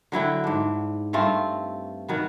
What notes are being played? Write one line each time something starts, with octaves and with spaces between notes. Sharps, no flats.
D3 F#3 E4 G5
G#2 D4
G2 A3 C4 F4
D#3 F#3 B3